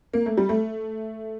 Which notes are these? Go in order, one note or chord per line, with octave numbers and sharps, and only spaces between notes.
A#3
A3
G3
A3